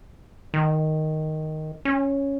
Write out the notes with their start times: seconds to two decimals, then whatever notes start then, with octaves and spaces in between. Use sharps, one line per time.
0.54 D#3
1.85 C#4